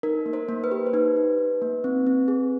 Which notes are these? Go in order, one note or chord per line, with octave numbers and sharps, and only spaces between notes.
D#4 A#4
A#3
A#4 C5
A#3
B4
G4
C5
D#4 B4
D#4
D#4
A#3
C4
C4
G#4